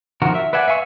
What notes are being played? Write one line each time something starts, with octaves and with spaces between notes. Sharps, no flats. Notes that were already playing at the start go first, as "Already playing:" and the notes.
D#3 F3 F#4 A#4
E5
B4 D5 E5 F#5 G#5
E5 F5 G#5 C#6 E6